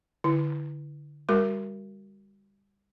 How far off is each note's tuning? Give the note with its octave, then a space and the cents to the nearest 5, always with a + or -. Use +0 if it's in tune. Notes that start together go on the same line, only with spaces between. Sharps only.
D3 +0 E4 +0
G3 +25 F#4 +20 A#4 +0